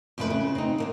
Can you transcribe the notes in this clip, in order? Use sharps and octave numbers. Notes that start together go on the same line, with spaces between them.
F2 C#3 G#3 A3 B4
C#3
C4 D#4
D3 F3 A#3